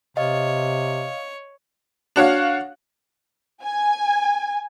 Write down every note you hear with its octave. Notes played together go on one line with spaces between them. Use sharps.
C3 C#5 D#5 F5
D4 F#4 C#5 F5
G#5